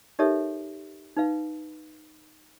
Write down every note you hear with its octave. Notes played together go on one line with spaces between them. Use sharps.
D#4 G4 A4 A#4 C#5 E5
D#4 B4 F5